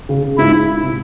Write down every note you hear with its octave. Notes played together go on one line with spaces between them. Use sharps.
C#3
C#3
G#2 E4
G#2
E4
C3